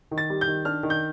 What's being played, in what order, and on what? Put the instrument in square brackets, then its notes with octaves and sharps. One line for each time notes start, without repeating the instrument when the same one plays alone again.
[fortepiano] D#3
[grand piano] A6
[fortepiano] G3
[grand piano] G6
[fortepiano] D#3
[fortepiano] D4 [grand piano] F6
[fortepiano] D#3
[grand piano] G6